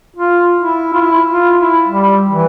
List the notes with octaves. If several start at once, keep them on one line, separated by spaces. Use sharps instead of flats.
F4
E4
F4
E4
F4
E4
G3
E3